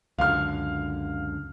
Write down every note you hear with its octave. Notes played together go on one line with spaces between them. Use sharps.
C#2 F#2 D3 F5 F6